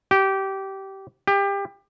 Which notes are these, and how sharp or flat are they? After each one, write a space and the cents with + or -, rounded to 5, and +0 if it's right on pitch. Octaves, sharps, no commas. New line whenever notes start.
G4 -20
G4 +25